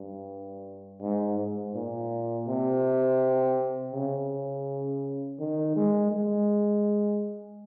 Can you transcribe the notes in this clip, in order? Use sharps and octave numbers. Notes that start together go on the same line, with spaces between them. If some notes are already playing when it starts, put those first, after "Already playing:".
Already playing: G2
G#2
G#2
A#2
C3
C#3
D#3
G#3
G#3